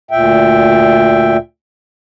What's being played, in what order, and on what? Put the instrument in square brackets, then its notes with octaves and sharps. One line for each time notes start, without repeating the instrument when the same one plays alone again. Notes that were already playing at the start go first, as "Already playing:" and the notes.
[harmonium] D2 A#2 E5 G5